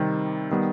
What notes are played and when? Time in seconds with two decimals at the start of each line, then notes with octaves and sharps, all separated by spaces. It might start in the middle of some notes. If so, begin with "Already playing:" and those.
Already playing: C3 D#3 G3 C4
0.51 D#3 G3 B3